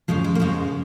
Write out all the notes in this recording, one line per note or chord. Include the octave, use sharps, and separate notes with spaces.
F2 C#3 F3 G#3
G#3
A#3
F2 C#3 F3 G#3